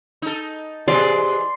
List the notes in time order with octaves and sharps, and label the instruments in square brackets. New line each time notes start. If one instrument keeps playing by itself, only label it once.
[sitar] D#4 A4
[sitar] E3 G#3 [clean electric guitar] G4 G#4 C5 [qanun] D5 [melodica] C6